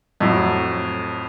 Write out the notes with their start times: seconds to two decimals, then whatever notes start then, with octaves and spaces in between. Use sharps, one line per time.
0.20 F2 A2 F#3